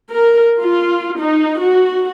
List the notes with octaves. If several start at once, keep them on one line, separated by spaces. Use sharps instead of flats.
A#4
F4
D#4
F#4